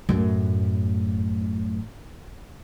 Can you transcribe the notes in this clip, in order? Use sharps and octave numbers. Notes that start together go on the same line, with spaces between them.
F#2 A2